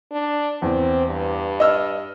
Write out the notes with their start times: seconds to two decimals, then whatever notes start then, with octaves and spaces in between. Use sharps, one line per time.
0.12 D4
0.62 E2 C4
1.07 G2
1.60 D#5 E6 F6